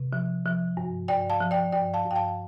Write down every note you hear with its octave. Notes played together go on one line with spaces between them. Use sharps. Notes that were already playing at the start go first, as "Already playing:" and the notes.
Already playing: C3
F3
F3
G2
G2 D5 G5
F5 A5
F3
D5 G5
G2 D5 G5
F5 A5
G2
G5
F5 A5